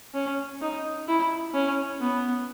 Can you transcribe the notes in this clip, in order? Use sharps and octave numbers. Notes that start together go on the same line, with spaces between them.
C#4
D#4
E4
C#4
B3